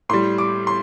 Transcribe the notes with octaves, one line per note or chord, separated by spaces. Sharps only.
A2 G3 C6
D6
C6